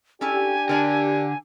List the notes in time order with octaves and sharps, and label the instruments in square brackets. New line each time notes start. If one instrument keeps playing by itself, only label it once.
[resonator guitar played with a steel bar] C#4 E4 A4 [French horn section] D4 G4 [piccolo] G#5
[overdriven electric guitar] D3 [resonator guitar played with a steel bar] A#4 D5 A5